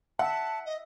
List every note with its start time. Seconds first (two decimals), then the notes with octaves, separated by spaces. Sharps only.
0.19 E5 F#5 A5
0.66 D#5